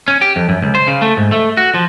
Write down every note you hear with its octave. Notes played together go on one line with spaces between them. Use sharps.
C#4
G4
F2
F#2
C#2
C5
C#3
A3
G#2
A3
F#4
F3